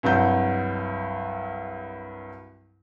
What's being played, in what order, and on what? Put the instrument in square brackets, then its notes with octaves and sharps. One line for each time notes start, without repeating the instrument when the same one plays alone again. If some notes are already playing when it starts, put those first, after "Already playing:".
[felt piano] C2 G2 F#3 G6